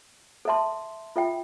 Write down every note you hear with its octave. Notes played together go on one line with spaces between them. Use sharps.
A4 E5 A5 C6
F4 A4 E5 G5